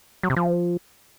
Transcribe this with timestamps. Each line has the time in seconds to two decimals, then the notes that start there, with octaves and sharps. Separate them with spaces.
0.23 F#3
0.30 C3
0.36 F3